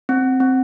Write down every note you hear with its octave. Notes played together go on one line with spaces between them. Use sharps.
C4
C4